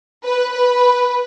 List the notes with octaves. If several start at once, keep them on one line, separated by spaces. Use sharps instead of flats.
B4
B4